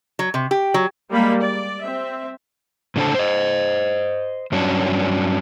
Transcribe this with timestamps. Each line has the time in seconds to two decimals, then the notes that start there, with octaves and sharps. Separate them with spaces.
0.19 F#3
0.34 C3
0.51 G4
0.74 F#3
1.11 G3 G#3 A#3 B5
1.41 D5
1.84 C4 E5
2.96 A2 C#3 D4 A4 C5 A5
3.15 C5 D#5
4.52 G2 F#3 C#4 D4